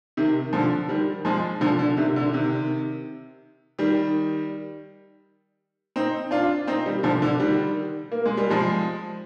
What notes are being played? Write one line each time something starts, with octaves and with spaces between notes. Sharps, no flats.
C3 D#3
D3 F3
D#3 G3
F3 G#3
D3 F3
D3
C3 D#3
D3
C3 D#3
D#3 G3
C4 D#4
D4 F4
C4 D#4
D#3 G3
D3 F3
D3
D#3 G3
A#3
G#3
G3
F3 G#3